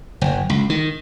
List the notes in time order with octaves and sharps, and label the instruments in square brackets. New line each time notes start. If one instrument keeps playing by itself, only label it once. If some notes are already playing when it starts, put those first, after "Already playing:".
[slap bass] F#1
C#2
D#3